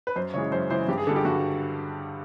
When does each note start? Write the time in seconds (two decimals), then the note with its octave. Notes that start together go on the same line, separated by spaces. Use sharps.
0.07 B4
0.16 F#2 C5
0.34 C#3 E3 G#3 C#5
0.52 F#2 C5
0.70 C#3 E3 G#3 C5
0.88 G2 G4
0.98 G#4
1.07 D3 G3 A4
1.16 G4
1.25 G2 F#4